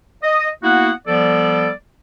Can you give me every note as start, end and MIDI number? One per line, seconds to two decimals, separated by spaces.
0.23 0.48 75
0.63 0.91 58
0.63 0.91 59
0.63 0.91 64
0.63 0.91 66
0.63 0.91 78
1.08 1.70 53
1.08 1.70 55
1.08 1.70 59
1.08 1.70 69
1.08 1.70 74